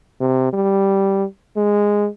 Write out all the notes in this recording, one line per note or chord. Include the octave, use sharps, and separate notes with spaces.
C3
G3
G#3